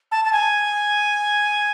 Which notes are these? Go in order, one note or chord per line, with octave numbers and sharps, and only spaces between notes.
A5
A5
G#5